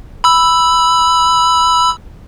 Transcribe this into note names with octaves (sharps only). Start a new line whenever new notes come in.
B5 E6